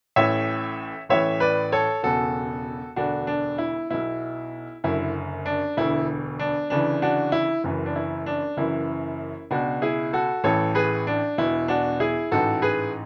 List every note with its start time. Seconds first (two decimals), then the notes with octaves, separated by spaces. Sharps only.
0.16 A1 A2 E3 C#5 E5
1.09 A1 A2 E3 C#5 E5
1.40 B4 D5
1.72 A4 C#5
2.03 E1 E2 C#3 F#4 A4
2.96 E1 D2 D3 D4 F#4
3.27 D4
3.58 E4
3.90 B1 B2 E4
4.84 F#1 F#2 D3 E4
5.46 D4
5.77 E1 D2 D3 E4
6.39 D4
6.70 D2 C#3 E3 D4
7.02 D4 F#4
7.32 E4
7.64 F#1 F#2 E3
7.86 D4
7.96 E4
8.26 D4
8.57 F#1 F#2 E3 E4
9.50 C#2 B2 D4 F#4
9.82 E4 G#4
10.13 F#4 A4
10.44 A1 A2 E3 A4 C#5
10.75 G#4 B4
11.07 D4
11.38 E1 E2 B2 E4
11.68 D4 F#4
12.00 E4 G#4
12.31 A1 G#2 E3 F#4 A4
12.62 G#4 B4